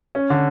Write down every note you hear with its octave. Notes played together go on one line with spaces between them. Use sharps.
C#4
D3